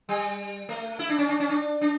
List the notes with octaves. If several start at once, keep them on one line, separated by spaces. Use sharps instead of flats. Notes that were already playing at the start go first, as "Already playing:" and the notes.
G3
A3
E4
D4
C#4
D4
C#4
D4
D4